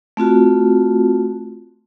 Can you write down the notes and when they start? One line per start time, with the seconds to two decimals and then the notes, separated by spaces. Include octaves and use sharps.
0.17 A3 C4 F4 F#4